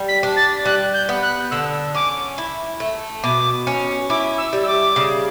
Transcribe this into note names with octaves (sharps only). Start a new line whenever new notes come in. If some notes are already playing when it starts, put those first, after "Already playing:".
Already playing: G3
B6
D4
A6
G3 F#6
G6
B3
F#6
D3 E6
C#4 D6
E4
A3
B2 D6
C#4
E4 D6
E6
G3
E6
D6
C#3